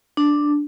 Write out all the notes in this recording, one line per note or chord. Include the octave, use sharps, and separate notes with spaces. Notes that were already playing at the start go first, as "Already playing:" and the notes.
D4